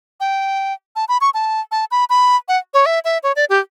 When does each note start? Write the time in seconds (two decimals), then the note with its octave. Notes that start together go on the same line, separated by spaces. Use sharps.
0.20 G5
0.96 A5
1.09 B5
1.21 C#6
1.34 A5
1.72 A5
1.91 B5
2.10 B5
2.48 F#5
2.74 C#5
2.86 E5
3.05 E5
3.23 C#5
3.36 D5
3.50 G4